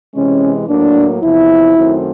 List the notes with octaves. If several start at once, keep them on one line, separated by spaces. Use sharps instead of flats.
C3 E3 G#3 C#4
A2 F#3 A#3 D4
E2 C3 F3 E4
F#2 D#3 F#3 A3 C4